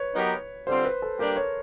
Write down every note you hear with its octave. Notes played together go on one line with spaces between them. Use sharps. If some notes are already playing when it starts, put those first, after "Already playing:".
Already playing: B4 C#5
F#3 B3 D#4 G4 A#4
D3 G3 C4 F4 C5
B4
A4
G3 A#3 D4 G4 A#4
C#5